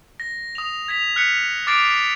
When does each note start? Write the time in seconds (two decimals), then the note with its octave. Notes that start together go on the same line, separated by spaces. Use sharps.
0.20 A#6
0.55 D#6 F7
0.88 G#6 B6 F7
1.16 F6 F#6 B6 C#7
1.67 D6 F6 A6 C7 D7 F7